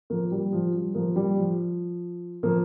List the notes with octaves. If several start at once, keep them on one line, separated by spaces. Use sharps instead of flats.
F3 A#3
G3
F3
G3
F3 A#3
G3
F3
F3 A#3